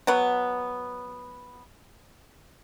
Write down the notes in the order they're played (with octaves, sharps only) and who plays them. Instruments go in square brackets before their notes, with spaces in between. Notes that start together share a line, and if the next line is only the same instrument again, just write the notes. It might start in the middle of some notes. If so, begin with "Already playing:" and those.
[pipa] F#3 B3